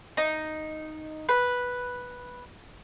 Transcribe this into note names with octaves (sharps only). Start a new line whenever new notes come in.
D#4
B4